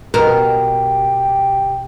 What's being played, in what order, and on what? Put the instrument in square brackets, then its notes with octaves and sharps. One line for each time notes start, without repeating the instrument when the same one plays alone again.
[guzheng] B2 [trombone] G4 [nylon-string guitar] A#4